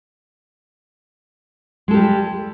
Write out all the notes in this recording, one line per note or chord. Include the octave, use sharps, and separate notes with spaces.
G3 G#3 G4 A4